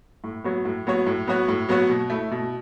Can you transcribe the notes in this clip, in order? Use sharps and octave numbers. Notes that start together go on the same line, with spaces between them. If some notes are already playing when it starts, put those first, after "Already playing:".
A2
F#3 B3 F#4 C#5
A2
F#3 B3 F#4 C#5
A2
F#3 B3 F#4 C#5
A2
F#3 B3 F#4 C#5
B2
A3 E4
B2